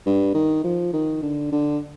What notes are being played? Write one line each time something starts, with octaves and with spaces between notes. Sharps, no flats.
G2
D#3
F3
D#3
D3
D3